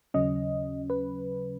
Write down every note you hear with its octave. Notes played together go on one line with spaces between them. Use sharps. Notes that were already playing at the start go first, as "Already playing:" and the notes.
D#2 C#3 F#3 C#4 D#5
B4